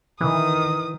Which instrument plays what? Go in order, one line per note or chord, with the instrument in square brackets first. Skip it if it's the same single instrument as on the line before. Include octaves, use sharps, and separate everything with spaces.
[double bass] D#3 [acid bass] E3 [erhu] D#6